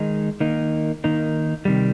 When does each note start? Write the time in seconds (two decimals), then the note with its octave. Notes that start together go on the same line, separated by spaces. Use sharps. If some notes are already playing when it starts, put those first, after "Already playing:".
Already playing: D#3 G#3 D#4
0.40 D#3 A#3 D#4
1.04 D#3 A#3 D#4
1.65 C3 D#3 G3